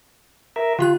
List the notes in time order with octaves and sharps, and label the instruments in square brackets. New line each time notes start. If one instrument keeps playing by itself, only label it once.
[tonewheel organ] A#4 E5
[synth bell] D3 G4 F#6 [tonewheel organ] F4